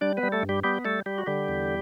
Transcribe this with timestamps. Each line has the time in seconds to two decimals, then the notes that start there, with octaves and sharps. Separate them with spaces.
0.01 G3 D4 D5
0.17 B3 B4
0.23 G3
0.32 A3 A4
0.43 G2
0.49 G3 G4
0.64 G3 B3 G4
0.85 G3 A3 A4
1.06 G3 G4
1.18 F#4
1.26 D3 G3 G4
1.48 E2